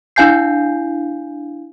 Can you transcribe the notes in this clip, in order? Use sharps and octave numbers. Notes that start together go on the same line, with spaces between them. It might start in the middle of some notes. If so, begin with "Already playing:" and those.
D4 E4 F5 G#5 G6 C7